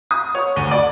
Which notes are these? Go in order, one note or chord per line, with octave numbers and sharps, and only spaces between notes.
D#6
C#5
D2
D5